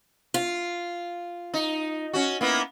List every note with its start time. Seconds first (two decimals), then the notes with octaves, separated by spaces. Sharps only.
0.34 F4
1.54 D#4
2.13 C#4 F#4
2.41 A#3 B3 E4